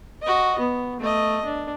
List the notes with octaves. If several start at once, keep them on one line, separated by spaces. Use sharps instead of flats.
F#4 D#5
B3
A3 D#5
D4